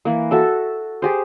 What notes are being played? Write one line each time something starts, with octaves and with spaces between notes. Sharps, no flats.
E3 A#3
F#4 A4 E5
G4 G#4 C5